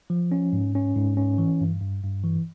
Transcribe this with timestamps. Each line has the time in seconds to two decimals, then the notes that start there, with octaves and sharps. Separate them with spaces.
0.10 F3
0.32 C#4
0.53 G#2
0.75 C#4
0.96 G#2
1.17 C#4
1.38 E3
1.61 G2
1.81 G2
2.03 G2
2.24 E3